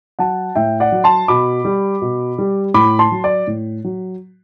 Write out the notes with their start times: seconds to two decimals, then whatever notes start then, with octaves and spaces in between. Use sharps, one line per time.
0.19 F#3 F#5 A5
0.55 A2 E5 G5
0.80 D5 F#5
0.92 F#3
1.04 A5 C6
1.28 B2 B5 D6
1.65 G3
2.02 B2
2.38 G3
2.74 A2 B5 D6
2.99 A5 C6
3.12 F#3
3.24 D5
3.47 A2
3.84 F#3